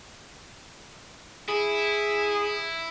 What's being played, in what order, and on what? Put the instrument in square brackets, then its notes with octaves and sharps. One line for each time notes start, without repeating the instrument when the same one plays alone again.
[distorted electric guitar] E4 [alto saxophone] G#4